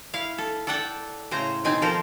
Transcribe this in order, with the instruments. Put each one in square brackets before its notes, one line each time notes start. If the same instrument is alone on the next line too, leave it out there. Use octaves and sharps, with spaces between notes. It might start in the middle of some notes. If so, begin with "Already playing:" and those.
[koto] E4 F5
A4
A4 D5 F#5 G5 A5
A2 C#3 C5 A#5
B2 D#3 C4 D#4 G#5
F3 A4 A#4 C5